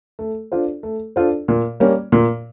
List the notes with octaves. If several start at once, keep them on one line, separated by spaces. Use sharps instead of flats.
A3
D4 F4 A4 C5
A3
D4 F4 A4 C5
A#2
G3 A#3 C#4
A#2